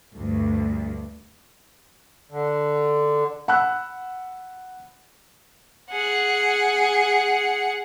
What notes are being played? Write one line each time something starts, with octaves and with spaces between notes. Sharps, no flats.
D2 G2
D3
F#5 B5 E6 F#6
G#4 F#5